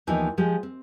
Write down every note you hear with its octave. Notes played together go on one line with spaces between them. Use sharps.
D#2 E3 F3 B3 D#4
F3 G#3 G4
C4